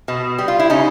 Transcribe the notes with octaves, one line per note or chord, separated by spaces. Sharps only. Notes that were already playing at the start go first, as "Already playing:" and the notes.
B2
G3
F4
E4
C#3 C#4 D#4